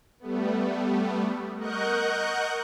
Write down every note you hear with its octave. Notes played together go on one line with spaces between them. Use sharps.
G3 A3 B3
A#4 D#5 F#5 C#6 F#6 G6